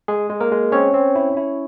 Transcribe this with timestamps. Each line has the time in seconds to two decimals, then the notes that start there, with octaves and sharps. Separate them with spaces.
0.08 G#3 G#4
0.30 G#3
0.41 A#3 A#4
0.52 G#3
0.72 C4 C#4 C#5
0.94 C4
1.15 E4
1.37 E4